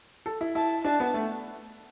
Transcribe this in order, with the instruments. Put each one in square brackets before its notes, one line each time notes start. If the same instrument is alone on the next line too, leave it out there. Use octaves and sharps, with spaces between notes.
[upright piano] A4
E4
[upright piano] E4 [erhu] A5
[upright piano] D4 [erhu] A5
[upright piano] B3
A3